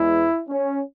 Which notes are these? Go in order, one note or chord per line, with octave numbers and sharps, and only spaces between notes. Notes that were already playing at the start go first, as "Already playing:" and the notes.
Already playing: E2 E3 G#3 E4
C#4